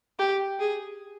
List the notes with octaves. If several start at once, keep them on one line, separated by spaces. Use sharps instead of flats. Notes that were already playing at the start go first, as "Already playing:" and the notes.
G4
G#4